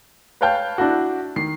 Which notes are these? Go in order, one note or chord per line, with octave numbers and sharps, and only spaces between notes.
B4 C#5 F5 G5 A5 G6
D4 E4 F#4
D#3 C7